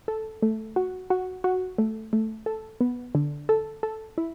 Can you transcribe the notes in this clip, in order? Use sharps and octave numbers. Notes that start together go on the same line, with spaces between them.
A4
A3
F#4
F#4
F#4
A3
A3
A4
B3
D3
A4
A4
E4